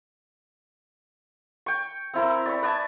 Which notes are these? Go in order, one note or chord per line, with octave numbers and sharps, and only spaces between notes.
G5 C#6
C4 E4 A#4
D5 B5 C#6
B4 D5 G#5 A5